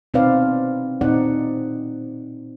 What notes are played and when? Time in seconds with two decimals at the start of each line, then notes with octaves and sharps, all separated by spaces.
0.14 B2 C4 D#4 B4 D5 F5
1.01 A#2 C4 D#4 D5 F#5